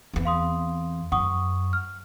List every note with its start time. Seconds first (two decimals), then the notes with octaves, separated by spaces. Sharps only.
0.13 E2 C4
0.25 F5 C6 D#6
1.12 F#2 F#5 C#6 D#6
1.73 F6